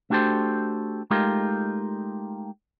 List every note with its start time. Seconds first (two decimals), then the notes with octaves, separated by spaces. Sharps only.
0.10 A3 D4 F#4 G4 A4 C5
1.11 G#3 A3 D#4 F4 G4 A#4